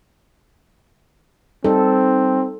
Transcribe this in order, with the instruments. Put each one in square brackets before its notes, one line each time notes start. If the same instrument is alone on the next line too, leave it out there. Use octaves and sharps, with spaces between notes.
[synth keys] G3 D#4 [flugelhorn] C4 [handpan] A4